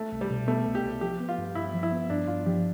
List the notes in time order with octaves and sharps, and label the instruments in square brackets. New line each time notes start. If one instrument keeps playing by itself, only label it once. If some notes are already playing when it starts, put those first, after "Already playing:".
Already playing: [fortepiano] A3
[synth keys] C2
[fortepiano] G3
[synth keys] B2
[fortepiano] A3 [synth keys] B3
[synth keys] C2
[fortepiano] G4
[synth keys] C2
[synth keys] F3 [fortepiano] G4
[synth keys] B3
[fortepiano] F4
[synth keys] G2
[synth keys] G2 [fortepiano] E4
[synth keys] F3
[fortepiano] E4
[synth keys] B3
[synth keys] G2 [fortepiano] D4
[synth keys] G2 [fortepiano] F4
[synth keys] F3 [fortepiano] G4